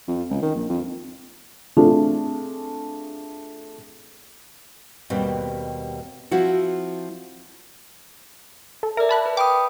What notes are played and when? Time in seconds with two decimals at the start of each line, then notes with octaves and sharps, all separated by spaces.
0.08 F2
0.30 C#2
0.42 D#3
0.56 A#1
0.70 F2
1.77 A3 C4 D4 F4 G#4
5.10 D#2 B2 G3 C4
6.31 F3 C4 E4 F#4
8.83 A4
8.97 A#4 D5 E5
9.09 A5 B5 F#6
9.26 B4
9.37 G5 B5 D6 D#6